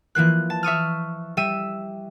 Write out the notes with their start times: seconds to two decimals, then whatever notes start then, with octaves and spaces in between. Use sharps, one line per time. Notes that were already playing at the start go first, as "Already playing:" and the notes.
0.15 E3 F3 A#3 F#6
0.50 A5
0.63 E5 C#6 D#6 F6
1.37 G3 E5 E6 D#7